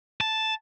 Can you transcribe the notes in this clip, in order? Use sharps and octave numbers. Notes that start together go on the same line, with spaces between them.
A5